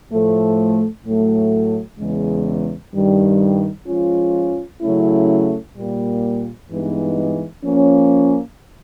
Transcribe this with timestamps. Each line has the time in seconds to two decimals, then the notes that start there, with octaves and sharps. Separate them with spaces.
0.11 A2 F3 A3
1.05 A2 F#3 A3
1.99 E2 C#3 E3 G#3
2.93 G2 D#3 G3
3.87 F3 G#3 C#4 F4
4.81 C#3 F#3 A3 C#4 E4
5.76 A#2 G3 A#3
6.70 G2 E3 G#3 B3 D#4
7.64 F3 A#3 C#4